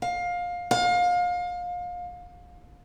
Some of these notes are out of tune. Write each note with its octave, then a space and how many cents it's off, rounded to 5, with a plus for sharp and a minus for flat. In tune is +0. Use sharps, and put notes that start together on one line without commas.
F5 +20
F5 +30